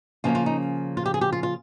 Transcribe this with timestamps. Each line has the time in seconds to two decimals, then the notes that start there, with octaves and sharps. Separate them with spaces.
0.24 C#3 F3 A#3 C#4 F4
0.35 F4
0.46 D#4
0.97 F4
1.06 G4
1.14 G#4
1.21 G4
1.32 F4
1.43 F4